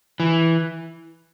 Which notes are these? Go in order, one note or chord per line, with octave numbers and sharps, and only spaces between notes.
E3